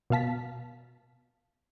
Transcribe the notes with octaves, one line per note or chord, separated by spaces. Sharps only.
B2 B3 F5 A5 B6